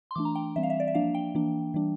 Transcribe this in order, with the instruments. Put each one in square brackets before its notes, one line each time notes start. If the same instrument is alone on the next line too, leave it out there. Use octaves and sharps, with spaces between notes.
[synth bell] C6
E3 A3 D4 D6
A#5
G5
E3 G3 C4 E5
F5
E5
D5
E5
F3 A#3 D4 F5
G5
E3 A#3 D4
E3 G3 D4